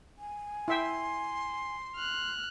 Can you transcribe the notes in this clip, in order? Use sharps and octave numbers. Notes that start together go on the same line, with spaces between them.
G#5
E4 E5 G5 C6
F6 F#6